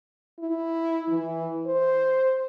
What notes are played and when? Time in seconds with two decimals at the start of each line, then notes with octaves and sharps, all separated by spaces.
0.39 E4
1.09 E3
1.66 C5